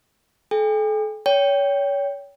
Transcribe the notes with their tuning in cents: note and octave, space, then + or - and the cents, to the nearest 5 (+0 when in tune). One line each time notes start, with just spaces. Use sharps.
A4 -40 G5 +45
C#5 +30 G5 +0